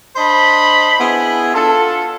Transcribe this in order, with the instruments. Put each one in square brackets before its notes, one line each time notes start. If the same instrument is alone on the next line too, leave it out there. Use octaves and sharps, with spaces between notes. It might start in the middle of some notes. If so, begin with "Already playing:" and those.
[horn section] D4 C5 D#5 B5
B3 E4 G#4
D4 F4 A4